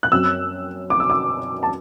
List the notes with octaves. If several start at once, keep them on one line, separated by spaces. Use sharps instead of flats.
F#6
F#2 F#3 C4 E6
D6
E6
D6
A5